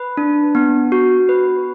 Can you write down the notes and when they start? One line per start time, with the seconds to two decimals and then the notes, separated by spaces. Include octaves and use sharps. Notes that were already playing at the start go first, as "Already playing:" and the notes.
Already playing: B4
0.17 D4
0.55 B3
0.92 F#4
1.29 B4